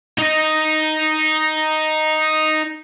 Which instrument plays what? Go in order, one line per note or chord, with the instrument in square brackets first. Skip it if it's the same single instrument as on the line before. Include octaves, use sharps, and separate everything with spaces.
[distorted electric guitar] D#4 D#5